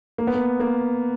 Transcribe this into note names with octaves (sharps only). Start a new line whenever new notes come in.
A#3
B3
A#3
A#3